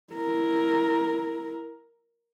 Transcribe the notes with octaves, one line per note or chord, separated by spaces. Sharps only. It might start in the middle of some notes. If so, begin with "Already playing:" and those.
E4 A#4